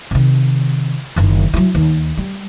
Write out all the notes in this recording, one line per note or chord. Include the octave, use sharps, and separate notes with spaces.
C3 D#3
F#1 D#3
F#3 E4
D#2
G3